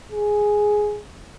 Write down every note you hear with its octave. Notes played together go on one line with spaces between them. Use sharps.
G#4